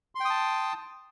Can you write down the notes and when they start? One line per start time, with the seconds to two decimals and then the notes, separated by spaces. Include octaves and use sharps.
0.15 C6
0.20 G5
0.25 D#6
0.30 A5